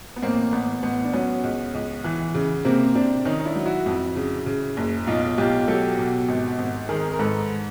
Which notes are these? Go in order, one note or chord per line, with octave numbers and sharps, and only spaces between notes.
B3
A1 A#3 C4
A1 B3
A1 B3
D4
F#3 B3 C#4
C#2
C#2
E3
C#3
C3 A#3 C4
C3 C4 D4
D#3 C#4 D#4
D#4
D4 E4
F#3
E4 F#4
F2
C#3
C#3
F#1
B1 D#4 F4
B1 F4 G4
F#3 G4 A4
B2
G#1
G#1
D#3 G#4 A#4
A#4
G#2 A4 B4